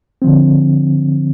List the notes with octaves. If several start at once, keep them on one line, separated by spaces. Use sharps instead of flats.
D3 F3 C4